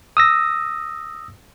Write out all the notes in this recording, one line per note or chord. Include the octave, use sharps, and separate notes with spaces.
D#6 E6 A#6